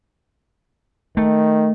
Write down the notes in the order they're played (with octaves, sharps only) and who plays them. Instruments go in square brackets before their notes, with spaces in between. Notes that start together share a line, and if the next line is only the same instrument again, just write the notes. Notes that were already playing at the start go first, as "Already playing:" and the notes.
[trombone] D#3 [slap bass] A3